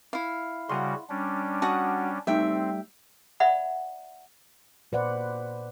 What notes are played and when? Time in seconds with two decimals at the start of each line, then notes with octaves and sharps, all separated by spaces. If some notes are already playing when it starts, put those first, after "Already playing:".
0.13 E4 F5
0.69 C#3 G3 F#4 F#5 G#5 C6
1.09 G3 C#4 D4
1.62 F#4 F#5 A5 D#6
2.27 G3 A3 C4 D#4 E5 G5
3.40 D5 E5 F#5 B5
4.92 A#2 B4 C5 D5 F#5